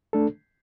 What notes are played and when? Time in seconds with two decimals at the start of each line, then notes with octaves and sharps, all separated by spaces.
0.13 A3 D4 A4